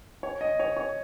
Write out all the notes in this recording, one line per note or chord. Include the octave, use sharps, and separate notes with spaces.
C#5
D#5
C#5
C#5